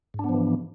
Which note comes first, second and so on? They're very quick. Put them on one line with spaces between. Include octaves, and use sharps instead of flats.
G#2 D4 B3 F3 E3